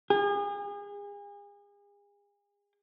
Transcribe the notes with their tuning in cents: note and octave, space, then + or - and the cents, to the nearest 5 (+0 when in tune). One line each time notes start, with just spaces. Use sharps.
G#4 -35